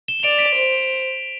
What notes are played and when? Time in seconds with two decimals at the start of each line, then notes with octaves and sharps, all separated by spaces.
0.08 E7 G7
0.20 G7
0.23 D5 D7 F7
0.39 B6 D7
0.55 C5